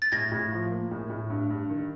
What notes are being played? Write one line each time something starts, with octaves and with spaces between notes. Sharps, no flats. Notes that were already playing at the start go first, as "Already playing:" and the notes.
A6
A2 G#6 A#6
A2
F3
A#3
A2
A2
G2
G2
D#3